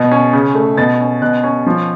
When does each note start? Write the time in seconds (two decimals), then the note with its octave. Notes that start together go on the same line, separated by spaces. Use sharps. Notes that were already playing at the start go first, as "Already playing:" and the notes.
Already playing: B2
0.11 C#4
0.33 C#3
0.55 A3
0.77 B2 A6
1.00 C#4
1.22 B2 F#6
1.44 C#4
1.67 F3